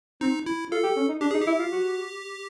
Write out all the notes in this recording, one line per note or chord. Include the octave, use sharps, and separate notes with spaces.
C4 D#4
E4
F4 A4
G4
C#4
D#4
D4 G4
D#4 G#4
G4
E4
F4
F#4